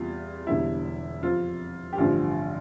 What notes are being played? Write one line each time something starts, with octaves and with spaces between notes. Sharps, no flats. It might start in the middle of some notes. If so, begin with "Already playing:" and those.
Already playing: E2 C3 G3 F4
E1 E2 D3 G3 E4
F2 C3 F3 F4
G4
A1 G2 D3 F3 F4